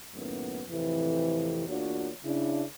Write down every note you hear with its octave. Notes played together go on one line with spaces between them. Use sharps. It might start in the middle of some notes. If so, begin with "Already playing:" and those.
F#2 A2 D#3 A#3 B3 C#4
F2 A2 C3 E3
E2 A#3 D4 F4 F#4 C#5
C#3 D4 E4